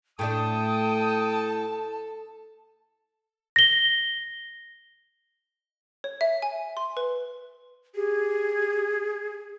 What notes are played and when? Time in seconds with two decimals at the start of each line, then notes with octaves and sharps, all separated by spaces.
0.19 A2 A3 D4 A4 G5 A5 D#6
3.56 A#6 G7
6.04 C#5
6.21 E5
6.42 G#5
6.77 C6
6.97 B4
7.95 G4 G#4